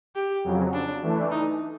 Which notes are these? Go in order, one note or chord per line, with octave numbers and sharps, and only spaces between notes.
G4
F2 C#3 F#3
D4
E3 A3 D4
D#4